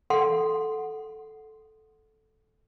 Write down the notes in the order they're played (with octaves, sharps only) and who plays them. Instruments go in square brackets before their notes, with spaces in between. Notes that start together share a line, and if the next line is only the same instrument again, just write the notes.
[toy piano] A4 F#5 C6